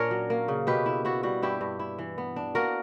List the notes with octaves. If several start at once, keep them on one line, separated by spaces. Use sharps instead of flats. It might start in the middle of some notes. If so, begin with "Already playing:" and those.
Already playing: A#2 C#4 D4 A#4 C#5
F#3
A#3
C#3
B2 G4 B4
E4
E4 F#4
G3 F#4
G2 E4 G4
G2
E4
E3
B3
D4
A#3 F#4 A#4